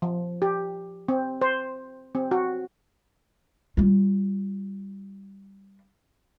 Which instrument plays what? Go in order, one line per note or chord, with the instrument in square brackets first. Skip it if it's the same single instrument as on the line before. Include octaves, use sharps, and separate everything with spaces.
[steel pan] F3
G4
C4
C5
C4
F#4
[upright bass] G3 F4